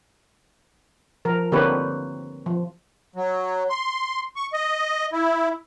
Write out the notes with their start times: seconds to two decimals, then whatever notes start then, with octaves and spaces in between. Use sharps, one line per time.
1.25 F3 A#4
1.52 D3 A#3 C4 G4 B4 C#5
2.46 F3
3.16 F#3
3.70 C6
4.36 C#6
4.53 D#5
5.13 E4